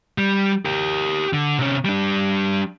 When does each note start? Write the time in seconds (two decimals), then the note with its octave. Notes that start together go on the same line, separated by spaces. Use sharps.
0.18 G3
0.65 G4 A#4
1.33 D3
1.59 C3 C#4
1.85 G3 D4